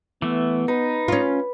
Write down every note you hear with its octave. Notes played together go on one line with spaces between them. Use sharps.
E3 A3 B3
D#4 B4
C#4 F4